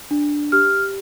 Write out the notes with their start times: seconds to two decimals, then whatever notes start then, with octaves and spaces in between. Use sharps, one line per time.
0.11 D4
0.52 G4 F6